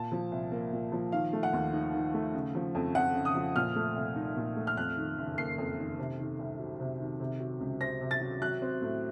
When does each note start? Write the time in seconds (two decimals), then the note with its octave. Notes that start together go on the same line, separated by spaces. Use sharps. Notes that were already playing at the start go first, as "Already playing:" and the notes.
Already playing: A#2 A5
0.12 F3
0.32 C2
0.52 A#3
0.72 A#2
0.92 F3
1.12 D#3 F5
1.33 A3
1.43 F#5
1.53 D#2
1.73 D#4
1.93 D#3
2.14 A3
2.34 C#3
2.55 F3
2.75 F2
2.95 F2 F#5
3.15 C#3
3.25 D#6
3.35 F3
3.56 A#2 F6
3.76 A3
3.96 C2
4.16 D#4
4.37 A#2
4.56 A3
4.67 F6
4.77 F2 F#6
4.97 D#3
5.18 F#1
5.37 A#3 C7
5.58 F2
5.78 D#3
5.99 C3
6.19 D#3
6.39 C2
6.59 F#3
6.80 C3
6.99 D#3
7.20 C3
7.40 F#3
7.61 C#2
7.81 C4 A#6
8.01 C3
8.11 A6
8.21 F#3
8.42 F#3 F#6
8.62 C4
8.82 A2